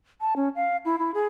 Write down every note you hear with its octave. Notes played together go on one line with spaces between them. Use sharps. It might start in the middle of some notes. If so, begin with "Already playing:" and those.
A5
C#4
F5
E4
E4
G#4